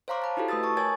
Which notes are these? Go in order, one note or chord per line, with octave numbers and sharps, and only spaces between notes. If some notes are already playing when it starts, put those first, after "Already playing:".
C5 C#5 F5 A#5 C6 D6
A5 B5
D#4 E4 F#4 G4 A4
A3 B4 D#6 E6 A6
A5 C#6 D#6
A#4 C#5 G#5 G#6 A6